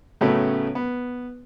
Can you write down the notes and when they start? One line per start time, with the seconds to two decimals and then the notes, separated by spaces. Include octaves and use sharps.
0.21 A2 C#3 F#3 A3 B3 C#4
0.75 B3